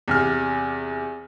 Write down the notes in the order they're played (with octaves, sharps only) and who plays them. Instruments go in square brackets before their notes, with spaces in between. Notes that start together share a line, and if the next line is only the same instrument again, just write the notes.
[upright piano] E2 C3 F6